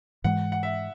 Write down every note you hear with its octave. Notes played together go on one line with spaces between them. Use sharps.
G#2 E3 G#3 F#5
F#5
E5